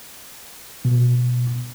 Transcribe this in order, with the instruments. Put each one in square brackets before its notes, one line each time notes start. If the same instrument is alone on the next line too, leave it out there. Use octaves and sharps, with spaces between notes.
[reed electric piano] B2